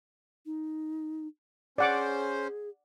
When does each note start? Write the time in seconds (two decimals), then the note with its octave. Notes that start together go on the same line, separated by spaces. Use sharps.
0.46 D#4
1.78 C#4 G#4 C5 D5 F#5 D6